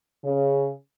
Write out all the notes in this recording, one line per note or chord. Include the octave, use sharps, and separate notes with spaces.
C#3